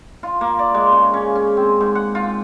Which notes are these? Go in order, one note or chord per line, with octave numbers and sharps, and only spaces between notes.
F4
A#3
D5
G#3
C#3
C#4
C#4
C4
G#2
F#5
F4